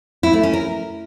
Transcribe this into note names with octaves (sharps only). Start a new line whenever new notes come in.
E4
A3
C#4
A#4